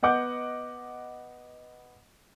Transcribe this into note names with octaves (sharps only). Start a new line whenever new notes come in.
B3 D#5 F#5 D6 G6